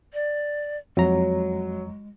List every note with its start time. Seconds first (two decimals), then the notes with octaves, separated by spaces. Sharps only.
0.14 D5
0.97 F2 F#3 G#3 A#5